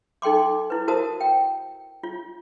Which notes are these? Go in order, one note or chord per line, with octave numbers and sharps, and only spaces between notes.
D#4 A4 G5 C6 D6
E4 B4
E4 F#4 A#4 C5 A5 D#6
G5
F4